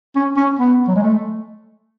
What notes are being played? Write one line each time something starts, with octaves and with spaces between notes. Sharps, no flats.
C#4
C#4
B3
F#3
G#3
A3